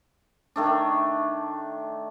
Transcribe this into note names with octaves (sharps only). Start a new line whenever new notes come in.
D#3 A3 D4